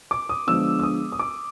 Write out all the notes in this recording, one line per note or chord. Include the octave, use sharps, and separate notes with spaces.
D6
D#6
D3 F3 G#3 B3 D4 E6
E6
D#6
D#6
D6